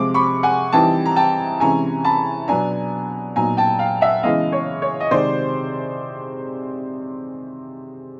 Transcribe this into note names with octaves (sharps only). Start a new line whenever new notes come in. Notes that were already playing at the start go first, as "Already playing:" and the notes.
Already playing: C3 F3 G#3 D6
B5 C#6
F#5 G#5
E3 G3 C4 D#4 G5 A5
A#5
G5 A5
C3 E3 G#3 C#4 G#5 A#5
A5 B5
B2 F#3 B3 D4 G#5 A#5
A#2 F#3 B3 D#4 G#5 A#5
G5 A5
F5 G5
E5 F#5
C#3 E3 G#3 B3 D#5 F5
C#5
C#5
D#5
C3 D#3 G#3 C4 D#4 C5 D5